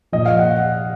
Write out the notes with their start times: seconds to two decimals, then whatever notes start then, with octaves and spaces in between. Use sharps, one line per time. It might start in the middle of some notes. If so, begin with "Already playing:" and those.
0.12 A#2 F3 D#5
0.26 F5
0.39 F#5